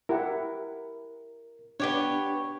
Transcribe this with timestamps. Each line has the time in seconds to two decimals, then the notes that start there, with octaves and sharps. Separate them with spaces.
0.09 E4 G4 A#4 F#5
1.80 B3 D4 G4 C#5